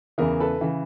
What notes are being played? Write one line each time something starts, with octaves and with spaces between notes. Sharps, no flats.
E2 C#3 E3 G#4 A#4
A4 B4
C#3 E3